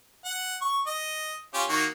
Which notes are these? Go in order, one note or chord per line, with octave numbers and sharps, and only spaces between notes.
F#5
C#6
D#5
C#4 F4 G4
D#3 A#3 F#4